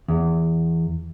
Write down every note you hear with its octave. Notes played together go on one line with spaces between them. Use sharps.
E2